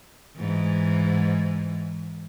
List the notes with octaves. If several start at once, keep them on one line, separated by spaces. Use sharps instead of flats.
G#2 E3